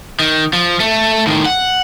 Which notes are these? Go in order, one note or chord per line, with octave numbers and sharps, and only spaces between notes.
D#3
F3
A3
A2 D#3
F#5